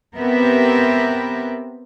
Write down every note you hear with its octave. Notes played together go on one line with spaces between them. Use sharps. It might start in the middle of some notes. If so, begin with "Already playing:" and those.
B3 C4 G4 A#4 B4 E5